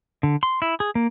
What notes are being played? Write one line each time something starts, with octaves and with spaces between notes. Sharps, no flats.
D3
C6
E4
G#4
A#3